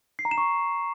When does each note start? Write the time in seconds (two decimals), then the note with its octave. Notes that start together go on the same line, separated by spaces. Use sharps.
0.19 C7
0.25 A#5
0.31 E7
0.38 C#6